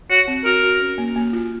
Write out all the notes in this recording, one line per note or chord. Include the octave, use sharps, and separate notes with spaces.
F#4 C#5
C4
F#4 A#4
F#4
C#4
A#3
A#3
F4